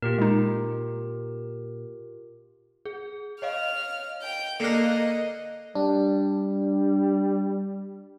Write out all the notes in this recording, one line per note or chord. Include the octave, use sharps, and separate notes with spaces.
A#2 F4 G4 A#4
G#3 D#4
G#4
C#5 D#5 F5 F6
G5 G6
D3 A#3 A#4 D#5 F#6 C7 C#7
G3 D4